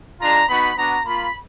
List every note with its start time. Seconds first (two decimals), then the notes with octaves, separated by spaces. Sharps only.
0.20 G#3 D4 F4 A#5
0.48 B3 D#4 F#4 B5
0.76 B3 D4 F#4 A#5
1.05 A#3 F4 B5